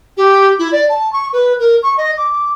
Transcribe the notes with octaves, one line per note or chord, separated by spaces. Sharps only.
G4
E4
D5
A5
C#6
B4
A#4
C#6
D#5
D6